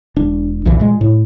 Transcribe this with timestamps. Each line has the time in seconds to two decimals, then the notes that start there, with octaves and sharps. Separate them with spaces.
0.16 E1 D4
0.65 B1 E2 A#2 E3
0.80 A#2 G#3
1.01 A2